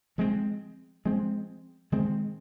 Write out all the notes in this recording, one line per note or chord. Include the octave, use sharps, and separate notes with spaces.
F3 G#3 C4
F3 G#3 C4
D#3 G#3 C4